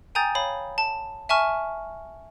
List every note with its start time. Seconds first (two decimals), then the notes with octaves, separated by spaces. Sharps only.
0.15 G5 G#5 A#5 D#6 G6 A6
0.35 C#5 F5 B5
0.78 A5
1.29 E5 G#5 A5 C#6 F6